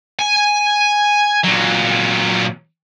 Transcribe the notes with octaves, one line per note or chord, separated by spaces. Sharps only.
G#5
A#2 F#3